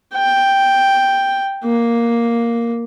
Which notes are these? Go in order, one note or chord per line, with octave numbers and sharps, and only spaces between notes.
G5
A#3